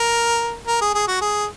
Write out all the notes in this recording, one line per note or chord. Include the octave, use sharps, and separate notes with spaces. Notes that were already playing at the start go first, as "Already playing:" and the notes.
Already playing: A#4
A#4
G#4
G#4
F#4
G#4